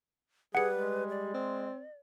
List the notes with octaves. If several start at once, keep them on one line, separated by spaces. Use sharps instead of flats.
G3 G#4 B4 F#5 C#7
G#3
D5
C4